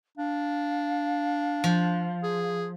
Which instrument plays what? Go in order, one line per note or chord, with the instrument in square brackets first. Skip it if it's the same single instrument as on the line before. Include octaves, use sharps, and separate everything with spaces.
[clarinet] D4 [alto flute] F5
[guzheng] F3
[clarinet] G#4